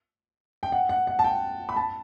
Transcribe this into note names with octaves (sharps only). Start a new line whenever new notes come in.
G5
F#5
F#5
F#5
A5
G5
B5
A5